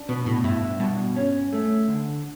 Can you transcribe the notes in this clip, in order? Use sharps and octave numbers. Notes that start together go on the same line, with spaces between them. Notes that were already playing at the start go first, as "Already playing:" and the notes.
Already playing: D4
B2 B3
A2
G2 E4
G2 B2
C#4
A3
D3